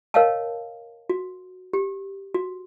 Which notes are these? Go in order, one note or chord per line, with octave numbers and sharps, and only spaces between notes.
A#4 C#5 D#5 F5 G5 A5
F#4
G4
F#4